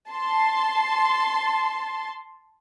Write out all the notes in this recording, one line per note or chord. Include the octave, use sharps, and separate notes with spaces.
A5 C6